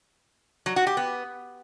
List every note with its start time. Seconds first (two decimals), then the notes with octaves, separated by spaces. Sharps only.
0.66 F#3
0.76 F#4
0.87 G4
0.97 B3